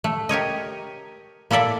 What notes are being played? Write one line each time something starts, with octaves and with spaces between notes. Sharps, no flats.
A3
G4 A#4 C#5 D#5
A#3 E4 A4 D5 E5